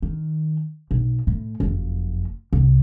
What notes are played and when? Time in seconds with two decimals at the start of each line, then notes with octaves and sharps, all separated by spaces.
0.02 D#3
0.91 B1
1.27 A2
1.60 F#1 F2
2.53 C2